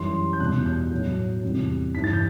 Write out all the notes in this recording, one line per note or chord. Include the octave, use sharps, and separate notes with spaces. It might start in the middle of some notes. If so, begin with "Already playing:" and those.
Already playing: F#2 E3 G3 C6
G6
E2 B2 G3 F#6
G6
A2 F#3 A3
E2 C3 G3
G2 E3 G3 B6
A6
G6